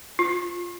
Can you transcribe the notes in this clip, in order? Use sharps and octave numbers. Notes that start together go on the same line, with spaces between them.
F4